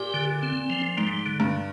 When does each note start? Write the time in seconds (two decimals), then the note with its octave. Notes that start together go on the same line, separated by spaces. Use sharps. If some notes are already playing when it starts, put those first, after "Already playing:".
Already playing: A#2 G4
0.14 D3
0.43 C4
0.70 F3
0.97 G#2 G3
1.26 D3
1.40 G2